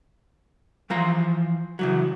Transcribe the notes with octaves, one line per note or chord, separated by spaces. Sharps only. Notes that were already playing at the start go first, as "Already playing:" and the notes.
E3 F3 F4 A#5
C#3 E3 F#3